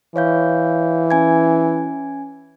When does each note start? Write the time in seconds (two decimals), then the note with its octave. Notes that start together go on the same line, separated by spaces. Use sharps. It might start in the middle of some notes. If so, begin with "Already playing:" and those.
0.16 E3 C#5 F5 G6
1.11 C#4 G#5 G#6